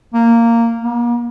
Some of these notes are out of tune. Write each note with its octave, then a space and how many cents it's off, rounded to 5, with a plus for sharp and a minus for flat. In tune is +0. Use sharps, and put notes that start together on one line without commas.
A#3 -10
A#3 +40